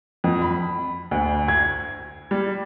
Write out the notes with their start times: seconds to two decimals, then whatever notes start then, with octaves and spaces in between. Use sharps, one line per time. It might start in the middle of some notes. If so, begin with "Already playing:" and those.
0.24 F2
0.42 B5
1.11 D2
1.48 G#6
2.31 G3